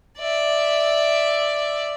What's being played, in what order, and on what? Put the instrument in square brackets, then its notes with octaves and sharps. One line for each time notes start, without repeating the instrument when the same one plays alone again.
[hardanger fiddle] D5 E5